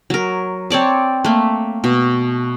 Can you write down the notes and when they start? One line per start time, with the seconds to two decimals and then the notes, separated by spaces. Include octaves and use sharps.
0.10 F#3 A#4
0.70 C4 C#5 D5 A5
1.24 A3 A#3
1.84 B2